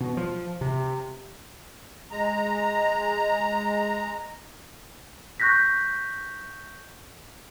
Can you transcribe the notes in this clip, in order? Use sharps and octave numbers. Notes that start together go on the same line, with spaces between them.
B2
F3
C3
G#3 A#5
C#6 F#6 G6 A#6 B6